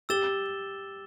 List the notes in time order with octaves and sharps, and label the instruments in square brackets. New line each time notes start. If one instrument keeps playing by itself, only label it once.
[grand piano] G4 [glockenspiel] E6 A6 E7 G7